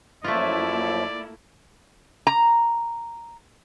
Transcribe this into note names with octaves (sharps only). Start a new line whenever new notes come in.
F#2 F3 A3 A#3 E4 F4 D5
A#5